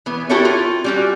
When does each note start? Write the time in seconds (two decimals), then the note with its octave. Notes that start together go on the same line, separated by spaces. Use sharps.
0.06 E3 B3
0.29 E4 F#4 G4 A4 A#4 C#5
0.45 F4
0.84 G3 C#4 F#4